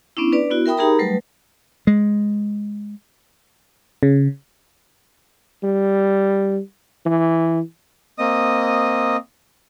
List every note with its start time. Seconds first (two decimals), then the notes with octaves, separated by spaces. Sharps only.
0.17 B3 C#4 D4 E4
0.32 D4 B4 D5
0.51 B3 E4 F#4
0.66 A#4 E5 G5 B5 D#6
0.77 D#4 G4 G#4 A#4 A#5 B5
0.98 F#3 G3 A3 B4
1.87 G#3
4.03 C#3
5.63 G3
7.06 E3
8.18 A#3 C4 D#5 D#6